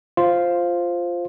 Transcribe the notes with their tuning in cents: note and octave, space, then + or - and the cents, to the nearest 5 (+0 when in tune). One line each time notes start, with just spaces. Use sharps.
F4 +0 C5 +0